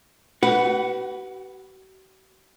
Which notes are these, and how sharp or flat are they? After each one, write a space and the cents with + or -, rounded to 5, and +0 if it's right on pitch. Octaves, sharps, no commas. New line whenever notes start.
F#4 +45 B4 +0 F#5 +0